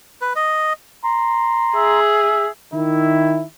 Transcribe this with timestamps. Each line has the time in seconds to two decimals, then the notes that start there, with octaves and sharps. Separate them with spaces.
0.22 B4
0.36 D#5
1.04 A#5 C6
1.76 G#4 E5
2.73 D#3 E4